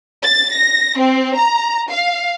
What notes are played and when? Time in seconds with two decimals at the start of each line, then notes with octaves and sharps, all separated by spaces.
0.24 A6
0.55 A#6
0.99 C4
1.37 A#5
1.90 F5